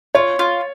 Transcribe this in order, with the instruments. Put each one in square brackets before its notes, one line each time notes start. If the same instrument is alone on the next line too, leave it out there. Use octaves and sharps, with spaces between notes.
[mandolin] F4 [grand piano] C#5
[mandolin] F4